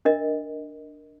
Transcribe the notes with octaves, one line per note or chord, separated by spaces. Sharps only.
D4 A#4 D#5 E5